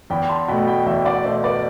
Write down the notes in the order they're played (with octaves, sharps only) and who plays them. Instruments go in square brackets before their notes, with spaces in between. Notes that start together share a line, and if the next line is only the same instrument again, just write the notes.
[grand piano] E2 [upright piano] G5 B5
[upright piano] A5 C6
[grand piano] B2 A3 [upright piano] G5 B5
[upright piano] G5 B5
[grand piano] E2 [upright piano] E5 G5
[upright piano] D5 F#5
[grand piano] B2 A3 [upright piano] C5 E5
[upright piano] B4 D5